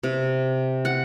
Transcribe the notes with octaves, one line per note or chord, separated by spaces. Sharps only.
C3
F#5